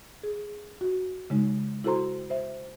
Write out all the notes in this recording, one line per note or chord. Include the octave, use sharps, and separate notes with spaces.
G#4
F#4
C#3 G#3 D#4
E4 F#4 A4 C5 A#5 C6
C5 E5